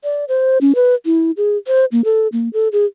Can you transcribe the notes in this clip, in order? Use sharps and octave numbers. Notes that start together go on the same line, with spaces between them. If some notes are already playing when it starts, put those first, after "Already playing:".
D5
C5
C#4
B4
E4
G#4
C5
A#3
A4
A#3
A4
G#4